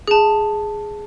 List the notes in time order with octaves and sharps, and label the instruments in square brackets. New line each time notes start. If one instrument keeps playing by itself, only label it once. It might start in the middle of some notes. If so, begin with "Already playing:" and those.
[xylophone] G#4 A5